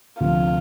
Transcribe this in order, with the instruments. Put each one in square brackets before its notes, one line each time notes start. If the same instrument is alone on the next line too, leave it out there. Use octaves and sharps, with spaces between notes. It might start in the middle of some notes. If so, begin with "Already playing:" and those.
[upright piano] D2 C3 F3 [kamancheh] F4